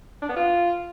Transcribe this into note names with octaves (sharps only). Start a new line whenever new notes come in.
D4
B3
F4